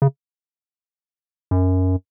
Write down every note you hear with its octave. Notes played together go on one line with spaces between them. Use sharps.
C#3
F#2